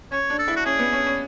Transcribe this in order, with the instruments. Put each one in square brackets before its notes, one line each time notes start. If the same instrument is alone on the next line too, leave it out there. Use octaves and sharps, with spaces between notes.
[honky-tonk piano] C#4 [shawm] C#5
[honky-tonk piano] D4
[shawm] A4
[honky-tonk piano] E4
[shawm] F#4
[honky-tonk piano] C#4 [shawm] G#4
[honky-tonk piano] B3
C#4
C#4